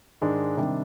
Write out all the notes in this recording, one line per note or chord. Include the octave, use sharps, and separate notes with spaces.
G#2 D#3 G#3 D4
C3 D#3 G3 D4